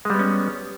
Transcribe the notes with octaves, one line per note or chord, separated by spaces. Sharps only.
G3 G#3 B3 C#4